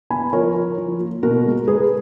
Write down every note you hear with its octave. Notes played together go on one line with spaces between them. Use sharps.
B3 G#5 B5
F3 A#4 C#5
F3
F3
A#3
B2 F#4 A#4
G#3
G#3 G#4 B4